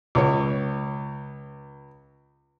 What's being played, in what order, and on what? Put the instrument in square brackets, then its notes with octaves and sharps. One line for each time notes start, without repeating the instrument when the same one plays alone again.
[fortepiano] C#2 C#5